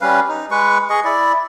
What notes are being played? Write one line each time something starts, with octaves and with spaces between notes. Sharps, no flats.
G3 C#4 B4 F5
D#4
G#3 B4 C#6
G#4 D#5 C#6
E4 D5